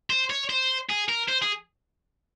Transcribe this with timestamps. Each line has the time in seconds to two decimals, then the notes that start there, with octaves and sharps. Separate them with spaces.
0.10 C5
0.30 C#5
0.50 C5
0.90 G#4
1.09 A#4
1.29 C5
1.42 G#4